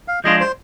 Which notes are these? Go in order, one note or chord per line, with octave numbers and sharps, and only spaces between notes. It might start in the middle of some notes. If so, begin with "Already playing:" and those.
F5
F3 G#3 D4 F4 D#5
C5